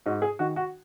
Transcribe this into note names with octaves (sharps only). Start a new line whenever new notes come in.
G#2 F#4
G#4
D#3 F#4
F#4